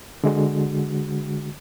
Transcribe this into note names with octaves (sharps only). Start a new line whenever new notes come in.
D3 G#3 F#4